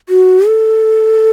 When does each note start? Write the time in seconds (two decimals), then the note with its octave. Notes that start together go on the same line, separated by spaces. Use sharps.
0.09 F#4
0.47 A4